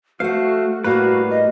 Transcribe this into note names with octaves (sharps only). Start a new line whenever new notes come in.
A3 F#4 C5 F5 F#5
A2 G3 A#3 F#4 B4 F5
D#5